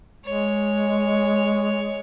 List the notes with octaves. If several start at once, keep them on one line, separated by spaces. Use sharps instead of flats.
G#3 C#5